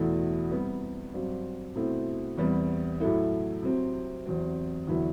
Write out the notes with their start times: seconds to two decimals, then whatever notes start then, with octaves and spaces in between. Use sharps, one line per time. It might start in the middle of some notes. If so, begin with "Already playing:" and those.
Already playing: E2 B2 A3 E4
0.50 C3 G3 B3
1.13 G2 F#3 C4
1.75 B2 A3 C4 E4
2.38 E2 C3 G3 B3
3.00 A2 F#3 A3 E4
3.62 C3 F#3 C4
4.26 E2 C3 F#3 C4
4.87 E2 D3 F#3 B3 E4